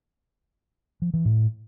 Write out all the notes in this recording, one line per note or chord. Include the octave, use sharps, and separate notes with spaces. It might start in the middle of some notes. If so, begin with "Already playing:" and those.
F3
E3
A2